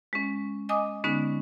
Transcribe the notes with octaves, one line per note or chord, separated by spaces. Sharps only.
G#3 C#4
D#5 G#5 D6 D#6
D3 G#3 B3 C#4 D#4